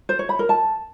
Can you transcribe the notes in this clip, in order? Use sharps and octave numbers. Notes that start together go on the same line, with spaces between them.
C5
C#5
B5
A#4
A5